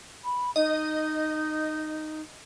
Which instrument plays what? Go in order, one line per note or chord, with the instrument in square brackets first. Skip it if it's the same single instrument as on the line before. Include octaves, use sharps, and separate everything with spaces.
[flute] B5
[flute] D#4 [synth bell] D#5